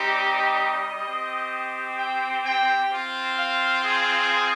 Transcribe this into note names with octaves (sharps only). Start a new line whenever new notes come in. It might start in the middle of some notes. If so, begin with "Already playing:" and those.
Already playing: G3 C4 D#4 G4
D#5
C4 G4
G5
G5
C4 F4
F5
G#4